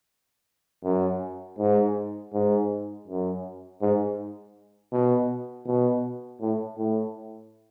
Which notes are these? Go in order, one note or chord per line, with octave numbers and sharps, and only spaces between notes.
F#2
G#2
G#2
F#2
G#2
B2
B2
A2
A2